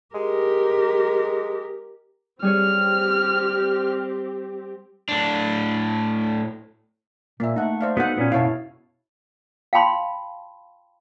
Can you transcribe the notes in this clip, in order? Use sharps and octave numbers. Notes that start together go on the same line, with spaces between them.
G#3 G4 A#4
G3 C4 G4 G#4 C#5 F6
A2 D4
A#2 A#3 E5
A3 D#4 F#5
C5 D5 F5
B3 D#4 F#4 A4 F#5
A#2 B3 C#4
F#2 B2 E4 C#5 F5 A5
F5 G5 A5 B5 C6